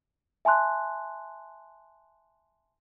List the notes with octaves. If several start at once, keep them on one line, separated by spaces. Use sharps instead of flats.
E5 G#5 A5 C6 F#6